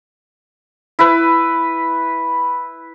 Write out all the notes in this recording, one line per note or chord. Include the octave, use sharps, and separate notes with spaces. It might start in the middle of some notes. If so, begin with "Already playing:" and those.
E4 B4